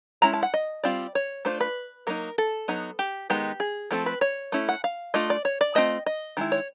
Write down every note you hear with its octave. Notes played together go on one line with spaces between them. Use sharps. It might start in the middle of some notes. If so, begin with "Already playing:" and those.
G#3 C#4 E4 A#5
A5
F#5
D#5
G3 C4 F4 D5
C#5
A3 D4 F4 C5
B4
F#3 A#3 D#4 A#4
A4
F#3 B3 D#4
G4
D#3 G#3 B3 D#4 G4
G#4
F3 A3 C4 A4
B4
C#5
A3 C#4 E4
F#5
F5
A3 D4 F4 D#5
D5
C#5
D5
A3 C4 F4 D#5
D#5
D#3 G#3 E4
C#5